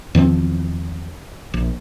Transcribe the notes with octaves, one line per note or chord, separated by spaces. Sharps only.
E2 D#3 F3 C4
A#1